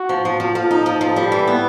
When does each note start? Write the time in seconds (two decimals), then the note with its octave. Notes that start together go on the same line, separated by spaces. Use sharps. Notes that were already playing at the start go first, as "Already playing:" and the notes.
Already playing: F#4
0.09 F3
0.25 F3
0.40 F3
0.55 F3 A4
0.71 D#4
0.86 F3
1.01 F3
1.16 G3
1.32 E3
1.47 B3